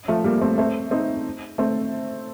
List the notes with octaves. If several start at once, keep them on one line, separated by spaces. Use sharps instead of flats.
F3 A3
G3 A#3
A3 C4
A3 C4
C4 D#4
A3 C4